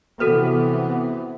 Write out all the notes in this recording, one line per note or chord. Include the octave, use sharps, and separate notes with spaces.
C3 E3 B3 F#4 A4 B4